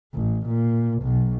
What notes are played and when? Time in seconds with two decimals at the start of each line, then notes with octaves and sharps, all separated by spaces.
0.14 A1
0.46 A#2
1.02 B1